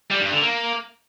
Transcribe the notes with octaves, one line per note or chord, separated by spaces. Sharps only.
G3
G2
D3
A#3